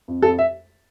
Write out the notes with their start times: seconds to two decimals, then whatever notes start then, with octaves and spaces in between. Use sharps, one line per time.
0.08 F2
0.22 F2 A4
0.39 E5